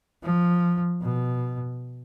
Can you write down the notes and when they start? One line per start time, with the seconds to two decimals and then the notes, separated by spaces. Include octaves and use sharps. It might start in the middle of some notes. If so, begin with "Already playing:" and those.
0.23 F3
1.02 B2